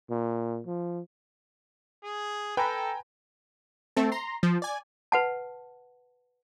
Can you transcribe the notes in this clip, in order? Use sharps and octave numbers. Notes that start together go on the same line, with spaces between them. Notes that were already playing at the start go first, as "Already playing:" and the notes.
A#2
F3
G#4
A4 B4 G5 G#5 A#5
A3 C4 A4
A#5 C6
F3
D5 G#5
B4 F#5 A5